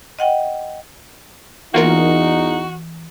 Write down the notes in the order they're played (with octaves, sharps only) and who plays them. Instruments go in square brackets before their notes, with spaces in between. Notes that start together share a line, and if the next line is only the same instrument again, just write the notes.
[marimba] D#5 F#5 G5
[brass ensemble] E2 D#4 [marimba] E3 [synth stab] A#3 F4 A#4 [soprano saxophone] F#4